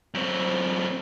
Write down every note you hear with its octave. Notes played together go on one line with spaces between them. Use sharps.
F#2 C4